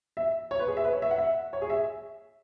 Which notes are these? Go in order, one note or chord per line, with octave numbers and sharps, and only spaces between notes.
E5
C#5
B4
G#4
E5
B4
C#5
E5
F#5
E5
C#5
G#4
E5